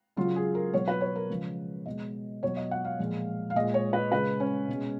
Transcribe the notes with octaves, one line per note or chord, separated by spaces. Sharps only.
C#3 F#3 F4
G#4
A#4
B2 F#3 C#5
B4
C#5
A#4
C#3 F3 G#3
B2 G#3 D#5
B2 F#3 C#5
D#5
F#5
F5
A#2 F3 G#3
F5
A#2 G#3 D#5
C#5
B4
C#3 G#3 B4
C#4
B2 G#3